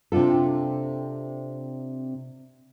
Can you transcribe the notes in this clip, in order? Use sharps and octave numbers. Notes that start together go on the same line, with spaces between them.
C3 C4 D4 F4 A4